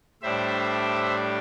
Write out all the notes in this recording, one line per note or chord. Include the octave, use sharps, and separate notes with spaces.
A2 G3 D4 C5 E5